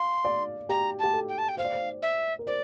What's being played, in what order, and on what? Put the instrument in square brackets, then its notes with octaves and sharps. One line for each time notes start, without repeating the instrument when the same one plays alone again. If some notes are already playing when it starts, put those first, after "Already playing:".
Already playing: [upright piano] F5 [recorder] C6
[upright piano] D5
[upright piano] G4 [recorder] A#5
[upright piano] G4 [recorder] A5
[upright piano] A4
[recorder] G5
A5
G5
[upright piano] C5 [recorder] F5
[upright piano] D5
C5
[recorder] E5
[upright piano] A#4
[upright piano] C5 [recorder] D5